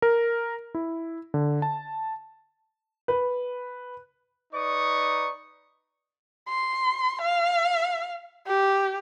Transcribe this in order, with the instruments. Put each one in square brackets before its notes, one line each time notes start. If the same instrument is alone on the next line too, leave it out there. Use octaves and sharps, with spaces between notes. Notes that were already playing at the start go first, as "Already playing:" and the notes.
[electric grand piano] A#4
E4
D3
A5
[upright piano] B4
[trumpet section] D#4 B4 D5 A#5 C#6 D#6
[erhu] C6
F5
G4